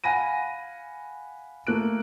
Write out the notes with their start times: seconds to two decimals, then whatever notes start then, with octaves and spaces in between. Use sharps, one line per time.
0.04 F5 F#5 G#5 B5 A#6 D#7
1.67 A3 A#3 F#6 D7